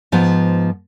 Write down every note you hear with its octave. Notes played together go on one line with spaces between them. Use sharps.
G#2 F3 B3